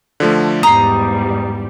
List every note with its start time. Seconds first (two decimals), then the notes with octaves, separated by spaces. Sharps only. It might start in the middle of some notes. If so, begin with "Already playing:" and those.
0.20 D3 F3 A3
0.63 E2 G#2 G3 A#5 D#6 C7